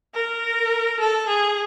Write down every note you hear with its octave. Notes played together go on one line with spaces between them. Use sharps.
A#4
A4
G#4